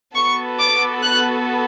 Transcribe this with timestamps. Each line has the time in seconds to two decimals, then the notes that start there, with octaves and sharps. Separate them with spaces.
0.15 B3 F#4 A4 C#6
0.59 D6
1.02 F#6